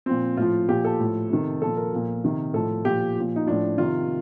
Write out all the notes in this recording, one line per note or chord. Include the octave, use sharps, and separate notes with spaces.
A#2 F3 C4
A2 F3 F4
A#2 F3 G4
A4
A2 F3
C3 D#3
A#2 F3 A4
A#4
A#2 F3
C3 D#3
A2 F3 A4
A#2 F3 G4
A#2 F3
D#4
A2 F3 D4
C3 D#3 F4